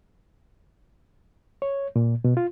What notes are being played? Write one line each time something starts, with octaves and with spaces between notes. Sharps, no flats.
C#5
A#2
B2
F4